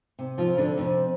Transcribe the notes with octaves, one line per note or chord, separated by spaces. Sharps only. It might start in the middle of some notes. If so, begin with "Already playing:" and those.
C3
F3 F4
F2
D3 D4
F2 C3 C4